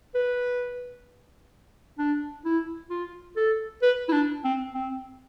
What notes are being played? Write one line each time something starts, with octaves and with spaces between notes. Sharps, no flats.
B4
D4
E4
F4
A4
B4
E4
D4
C4
C4